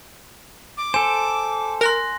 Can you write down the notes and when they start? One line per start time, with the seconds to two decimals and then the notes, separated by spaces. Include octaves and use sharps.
0.77 D6
0.94 A4 C5 G#5
1.81 A#4 C6 F#6 A#6